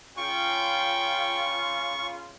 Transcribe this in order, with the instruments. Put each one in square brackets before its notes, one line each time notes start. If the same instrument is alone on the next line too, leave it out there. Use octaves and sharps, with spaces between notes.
[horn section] C#3 F4 [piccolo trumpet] G5 [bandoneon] C#6